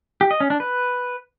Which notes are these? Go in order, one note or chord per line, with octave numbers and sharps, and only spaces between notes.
G4
D#5
C#4
D4
B4